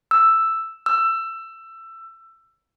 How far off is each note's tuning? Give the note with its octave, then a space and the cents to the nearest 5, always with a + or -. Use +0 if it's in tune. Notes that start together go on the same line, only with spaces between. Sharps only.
E6 +5
E6 +20